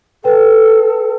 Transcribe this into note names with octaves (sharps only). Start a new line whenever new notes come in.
A4 B4 G5